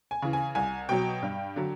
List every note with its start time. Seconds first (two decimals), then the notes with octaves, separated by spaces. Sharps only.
0.11 G#5
0.22 C#3 E3
0.33 G#5
0.55 C2 G#5
0.89 B2 F#3 G5
1.22 G2
1.56 D3 F#3